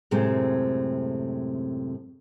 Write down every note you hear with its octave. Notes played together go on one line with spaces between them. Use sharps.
F#2 A2 C3 G#3 A3 C4